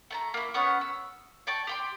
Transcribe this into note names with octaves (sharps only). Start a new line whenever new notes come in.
A3 A5 A#5
A#3 E4
B3 C#4 F#5 C#6
E6
D5 G5 A5 C#6
G4 G5 C6